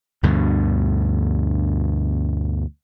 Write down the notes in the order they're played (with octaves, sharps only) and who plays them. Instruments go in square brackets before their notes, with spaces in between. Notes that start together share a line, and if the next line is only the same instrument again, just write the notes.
[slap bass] D2 G2 B2 D3